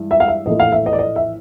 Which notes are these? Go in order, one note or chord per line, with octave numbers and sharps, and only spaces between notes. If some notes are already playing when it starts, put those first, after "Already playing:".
Already playing: G2 E3 G#3
E5
F5
E5
A#1 A2 E3 A3 D#5
F5
E5
D#5
D5
D#5
E5